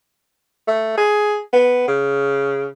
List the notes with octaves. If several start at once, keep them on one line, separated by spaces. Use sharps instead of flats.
A3
G#4
B3
C#3